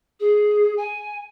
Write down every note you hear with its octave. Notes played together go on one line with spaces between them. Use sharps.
G#4
G#5